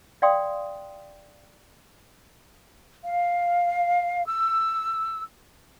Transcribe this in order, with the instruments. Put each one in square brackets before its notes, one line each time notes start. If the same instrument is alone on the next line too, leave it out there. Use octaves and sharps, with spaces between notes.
[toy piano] D5 F5 G5 C6 D#6
[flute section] F5
E6